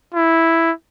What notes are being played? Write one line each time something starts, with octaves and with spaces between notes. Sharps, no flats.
E4